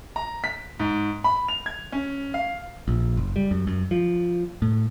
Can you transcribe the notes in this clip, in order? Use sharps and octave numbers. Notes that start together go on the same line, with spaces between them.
A#5
B6
G#2
B5
F7
G#6
C#4
F5
A#1
F#1
G3
F#2
F#2
F3
A2